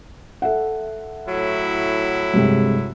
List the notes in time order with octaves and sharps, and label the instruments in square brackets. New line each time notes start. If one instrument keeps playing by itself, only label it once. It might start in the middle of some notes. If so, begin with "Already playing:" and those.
[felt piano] A4 E5 F#5
[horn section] A2 F#3 E4
[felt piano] G2 C3 G#3